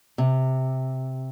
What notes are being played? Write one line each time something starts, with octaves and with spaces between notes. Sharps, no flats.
C3